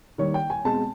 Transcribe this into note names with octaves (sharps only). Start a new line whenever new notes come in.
D#3 G3 A#3 C#5
G5
G#5
B2 G#3 C4 A5